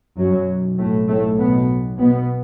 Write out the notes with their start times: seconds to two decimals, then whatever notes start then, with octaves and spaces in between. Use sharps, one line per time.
0.17 B1 F#2 B2 F#3
0.78 A2 A3
1.08 A2 A3
1.38 B2 B3
1.99 B2 B3